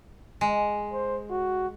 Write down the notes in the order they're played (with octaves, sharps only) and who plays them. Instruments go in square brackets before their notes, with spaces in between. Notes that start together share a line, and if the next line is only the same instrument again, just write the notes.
[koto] G#3
[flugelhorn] C5
F#4